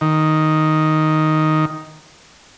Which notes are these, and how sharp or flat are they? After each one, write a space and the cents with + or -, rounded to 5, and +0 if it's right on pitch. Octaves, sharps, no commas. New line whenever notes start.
D#3 +0